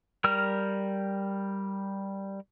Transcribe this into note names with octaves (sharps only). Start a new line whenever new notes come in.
G3 A#4 F6